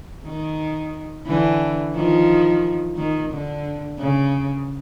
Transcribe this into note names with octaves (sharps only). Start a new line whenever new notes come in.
D#3
D3 E3
D#3 F3
D#3
D3
C#3